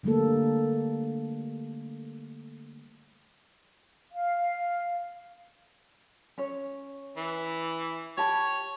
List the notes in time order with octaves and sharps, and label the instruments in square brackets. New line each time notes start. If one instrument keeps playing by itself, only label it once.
[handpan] D3 G3 A3 A#3 A4
[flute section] F5
[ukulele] C#4 C#5
[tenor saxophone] E3
[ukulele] G4 A5 B5 [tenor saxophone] C#5